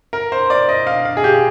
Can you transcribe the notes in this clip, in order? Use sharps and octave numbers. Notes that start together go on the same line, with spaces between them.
A#4
C5
D5
D#5
F5
F5
G#4
G4